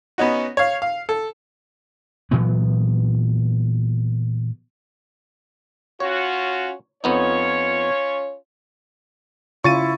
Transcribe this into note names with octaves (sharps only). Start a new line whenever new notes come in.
B3 C#4 D#4 F#4
C#5 F5
F5
A4
A#2 E3 F#3 B3
C#4 F4 F#4 C#5
F2 B3 C#4 D#4 F4 C#5
C#3 E4 F4 C#6 A6 D#7